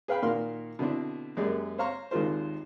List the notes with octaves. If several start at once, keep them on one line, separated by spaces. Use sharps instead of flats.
G#4 B4 F5 G5 B5
A#2 D#3 F#4 A#4 F5 C6
B2 D3 C4 D4 E4
F#2 G#3 A#3 G4 G#4 D5
C5 C#5 F5 A#5 C6 C#6
G#1 D#2 G#3 F4 A#4 C5